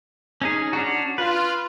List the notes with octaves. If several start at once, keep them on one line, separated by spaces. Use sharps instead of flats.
C#4 D#4 G#4
C#4 D4 F#4
F4 B4